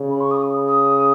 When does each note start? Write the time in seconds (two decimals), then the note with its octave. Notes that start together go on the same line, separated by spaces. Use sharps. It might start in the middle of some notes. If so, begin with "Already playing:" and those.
Already playing: C#3
0.10 B5
0.21 C#6
0.31 D#6
0.68 D#6